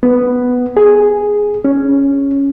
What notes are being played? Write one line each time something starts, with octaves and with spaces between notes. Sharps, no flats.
B3
G#4
C#4